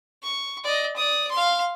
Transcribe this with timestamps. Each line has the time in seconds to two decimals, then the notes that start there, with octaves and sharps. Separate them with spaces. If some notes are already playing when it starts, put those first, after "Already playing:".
0.22 C#6
0.64 D5 D#5
0.96 D5 D#6
1.31 F5 C6